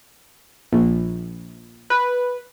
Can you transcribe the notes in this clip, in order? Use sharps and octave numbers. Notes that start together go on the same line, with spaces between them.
A#1
B4